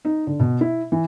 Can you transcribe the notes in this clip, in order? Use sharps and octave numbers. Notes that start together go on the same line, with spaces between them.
D#4
D3
B2
E4
E3